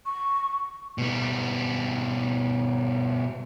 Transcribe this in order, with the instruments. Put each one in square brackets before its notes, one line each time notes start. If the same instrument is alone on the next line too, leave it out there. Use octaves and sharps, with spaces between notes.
[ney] C#6
[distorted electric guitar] B2 G3